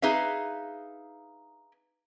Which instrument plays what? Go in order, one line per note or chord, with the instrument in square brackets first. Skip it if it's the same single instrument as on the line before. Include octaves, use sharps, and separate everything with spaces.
[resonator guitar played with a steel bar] D#4 G#4 B4 E5 F5